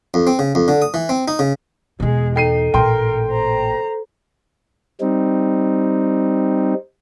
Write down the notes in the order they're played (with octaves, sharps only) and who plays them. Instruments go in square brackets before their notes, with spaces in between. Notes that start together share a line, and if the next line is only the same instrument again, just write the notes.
[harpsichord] F2
C4
C#3
F2
D3
D#6
E3
C4
D#4
C#3
[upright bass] E2 B2 [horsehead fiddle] G#3 G#4
[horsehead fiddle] D#4 [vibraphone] A4 [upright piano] G5 C7 D#7
[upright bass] A1 A#2 [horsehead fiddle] A#4 [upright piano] G5 C6
[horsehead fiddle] C5 A#5
[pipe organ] G3 C4 D#4